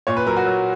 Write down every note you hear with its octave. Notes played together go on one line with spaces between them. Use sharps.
A#2 C#5
B4
F#3 A#4
F#4
F#3